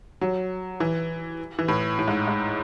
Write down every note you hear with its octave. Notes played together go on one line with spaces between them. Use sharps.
F#3
E3
E3
A2
A2
G#2
G#2